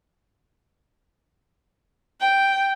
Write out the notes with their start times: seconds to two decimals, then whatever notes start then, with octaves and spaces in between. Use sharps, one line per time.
2.21 G5